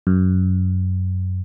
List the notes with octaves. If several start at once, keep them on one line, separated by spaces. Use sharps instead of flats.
F#2